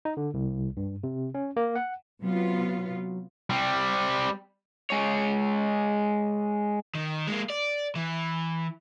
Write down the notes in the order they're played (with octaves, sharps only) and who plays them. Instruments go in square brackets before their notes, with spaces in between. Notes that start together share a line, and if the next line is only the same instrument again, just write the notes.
[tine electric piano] D#4
D3
C2
G2
C3
C#4
A#3
F#5
[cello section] C3 B3 F4 [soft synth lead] F#3
[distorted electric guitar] G3 C4
[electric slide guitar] G#3 C#5
[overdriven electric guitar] D#3
G#3 A#3
D5
E3